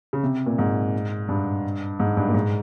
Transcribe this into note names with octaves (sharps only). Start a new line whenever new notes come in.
C#3
C3
A#2
G#2
G2
G#2
G2
A#2
G#2